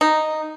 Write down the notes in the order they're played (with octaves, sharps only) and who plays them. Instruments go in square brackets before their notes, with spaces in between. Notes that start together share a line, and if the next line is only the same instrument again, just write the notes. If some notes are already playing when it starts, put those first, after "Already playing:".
[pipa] D#4